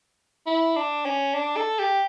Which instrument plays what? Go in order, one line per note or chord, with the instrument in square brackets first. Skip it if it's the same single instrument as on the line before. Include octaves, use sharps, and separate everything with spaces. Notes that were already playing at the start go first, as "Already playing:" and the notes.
[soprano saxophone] E4
D4
C#4
D4
A4
G4